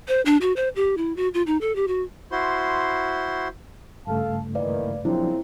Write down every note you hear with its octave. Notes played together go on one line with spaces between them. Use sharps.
C5
D4
F#4
C5
G4
E4
F#4
F4
D#4
A4
G4
F#4
E4 F#4 C5 C6
G2 C#3 A3 A4 F5 A5
D#3 E3 A#3 B4 D5 F5
A#2 C#3 F3 F#3 C4 D4 E4